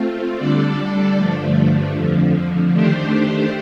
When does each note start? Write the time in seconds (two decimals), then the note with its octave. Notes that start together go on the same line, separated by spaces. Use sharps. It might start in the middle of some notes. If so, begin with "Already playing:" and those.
Already playing: A3 C4 F4
0.36 D3 G3 D4 A4 D5
1.15 G2 D3 F3 A3
1.93 F2 D3 F3
2.72 D#3 A3 D4 G4 C5